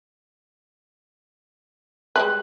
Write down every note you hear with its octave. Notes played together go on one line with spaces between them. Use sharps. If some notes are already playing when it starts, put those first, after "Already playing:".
G3 G#3 B4 F#6